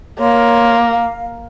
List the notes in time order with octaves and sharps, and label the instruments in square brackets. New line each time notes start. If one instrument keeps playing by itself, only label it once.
[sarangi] A#3 [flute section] A#4 C#5 C6
[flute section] F5